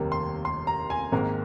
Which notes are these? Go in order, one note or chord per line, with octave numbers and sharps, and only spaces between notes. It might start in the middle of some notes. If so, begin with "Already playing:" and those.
Already playing: F1 D#2 D#3 G3 A#3
C6
C6
A#5
G#5
G#1 G#2 D#3 A#3 A#4